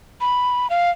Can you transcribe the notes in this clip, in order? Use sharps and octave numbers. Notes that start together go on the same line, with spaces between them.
B5
F5